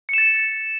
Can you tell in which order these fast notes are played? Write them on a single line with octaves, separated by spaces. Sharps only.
C#7 E7 A6